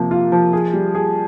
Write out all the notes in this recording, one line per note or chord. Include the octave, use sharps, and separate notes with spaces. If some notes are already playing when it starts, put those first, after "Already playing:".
Already playing: C3 F3 A#3
F4
F3
G#4
G3
G#4